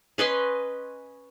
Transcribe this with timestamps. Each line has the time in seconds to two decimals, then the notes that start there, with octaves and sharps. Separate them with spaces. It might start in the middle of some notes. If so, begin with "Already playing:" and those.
0.18 C#4 B4 D#5 C6